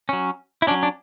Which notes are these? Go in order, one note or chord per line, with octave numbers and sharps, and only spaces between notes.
F#3 C#4
E4
F#3 C#4 D4
D4